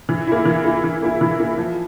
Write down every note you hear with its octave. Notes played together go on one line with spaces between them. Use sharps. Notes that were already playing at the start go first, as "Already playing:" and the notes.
E3
A#3 E4
E3
A#3 E4
E3
A#3 E4
E3
A#3 E4
F3